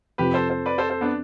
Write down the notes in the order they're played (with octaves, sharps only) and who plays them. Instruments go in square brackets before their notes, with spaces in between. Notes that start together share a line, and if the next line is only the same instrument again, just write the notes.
[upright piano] F2 C3 F3 [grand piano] G4 B4
[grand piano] A4 C5
A4 C5
B4 D5
A4 C5
A4 C5
B3 D4